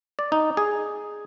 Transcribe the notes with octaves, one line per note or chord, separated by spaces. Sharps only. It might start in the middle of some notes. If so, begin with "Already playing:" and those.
D5
D#4
G#4